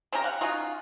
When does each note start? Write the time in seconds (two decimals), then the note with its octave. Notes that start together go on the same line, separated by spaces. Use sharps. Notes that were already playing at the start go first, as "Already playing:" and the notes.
0.12 C4 C#4 G4 A#4
0.24 F5 F#5
0.41 C#4 D#4 F4 F#4